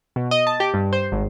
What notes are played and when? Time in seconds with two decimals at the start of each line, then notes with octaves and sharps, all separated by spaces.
0.16 B2
0.31 D#5
0.47 A5
0.60 G4
0.74 G2
0.93 C5
1.12 G#1